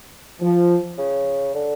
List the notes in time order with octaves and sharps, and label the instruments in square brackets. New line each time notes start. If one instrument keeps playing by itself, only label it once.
[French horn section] F3
[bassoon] C#3
D3